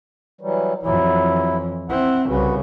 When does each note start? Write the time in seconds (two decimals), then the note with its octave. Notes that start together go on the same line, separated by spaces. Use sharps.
0.41 E3 F#3 G3
0.83 F2 E3 F#3 E4
1.89 C4 E4 F#5
2.29 C2 C#3 F#4 B4